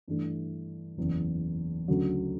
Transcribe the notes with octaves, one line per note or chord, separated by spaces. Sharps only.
G2 E3 A3
F#1 E2 C#3
D2 C#3 F#3